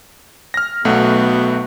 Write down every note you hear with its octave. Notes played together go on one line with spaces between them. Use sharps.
F6 A#6
B1 A3 B3 F#4